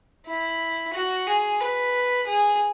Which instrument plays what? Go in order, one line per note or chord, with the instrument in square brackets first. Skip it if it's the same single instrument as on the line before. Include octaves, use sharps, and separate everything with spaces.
[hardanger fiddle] E4
F#4
G#4
B4
G#4